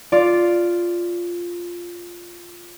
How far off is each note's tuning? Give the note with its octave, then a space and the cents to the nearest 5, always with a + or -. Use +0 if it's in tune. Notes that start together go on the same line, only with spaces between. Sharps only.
F4 +0 D5 +0